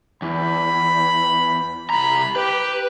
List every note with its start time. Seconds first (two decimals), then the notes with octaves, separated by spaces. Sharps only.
0.22 E2 B5
1.90 C2 A#5 B5
2.36 G4 B4